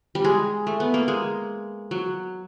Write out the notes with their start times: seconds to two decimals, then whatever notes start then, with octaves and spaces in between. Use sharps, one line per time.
0.15 G3
0.24 G#3
0.67 A3
0.80 B3
0.94 A#3
1.08 G#3
1.91 F#3